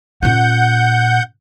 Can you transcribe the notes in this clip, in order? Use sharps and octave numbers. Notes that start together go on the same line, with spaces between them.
A#2 C#4 F#5 G6